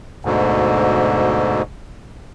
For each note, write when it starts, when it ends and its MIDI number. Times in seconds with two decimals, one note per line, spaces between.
0.25 1.62 38
0.25 1.62 44
0.25 1.62 47
0.25 1.62 50